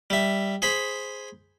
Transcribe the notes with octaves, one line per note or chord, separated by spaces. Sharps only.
G3 E5
G#4 C5 B5